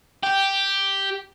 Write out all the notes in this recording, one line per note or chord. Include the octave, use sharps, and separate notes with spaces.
G4